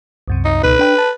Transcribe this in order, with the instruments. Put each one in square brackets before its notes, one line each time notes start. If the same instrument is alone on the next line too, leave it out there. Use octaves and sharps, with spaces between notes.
[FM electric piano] C2 F#2 C3
[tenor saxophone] D#4
[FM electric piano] C#2 B2 D#4 [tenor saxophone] B4
[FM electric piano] D4 G5 B5
A5